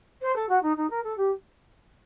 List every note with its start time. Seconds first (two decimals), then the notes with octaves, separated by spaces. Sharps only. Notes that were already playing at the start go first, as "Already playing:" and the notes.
0.21 C5
0.35 A4
0.49 F#4
0.62 D#4
0.76 D#4
0.90 A#4
1.03 A4
1.17 G4